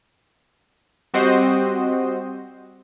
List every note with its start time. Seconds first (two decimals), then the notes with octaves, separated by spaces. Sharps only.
1.14 G3 C4 F#4 G4 C5 D#5